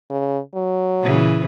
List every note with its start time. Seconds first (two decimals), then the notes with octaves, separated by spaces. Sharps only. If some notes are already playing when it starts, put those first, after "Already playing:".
0.10 C#3
0.55 F#3
1.01 A#2 C#3 E3